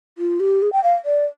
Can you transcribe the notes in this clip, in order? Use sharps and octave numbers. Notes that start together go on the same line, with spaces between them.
F4
G4
G#4
G5
F5
D5